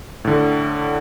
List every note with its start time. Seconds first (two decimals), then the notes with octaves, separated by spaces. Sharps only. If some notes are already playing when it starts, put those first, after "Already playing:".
0.25 A2 D3